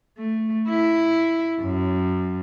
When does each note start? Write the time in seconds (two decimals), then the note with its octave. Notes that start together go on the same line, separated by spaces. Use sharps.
0.18 A3
0.69 E4
1.62 F#2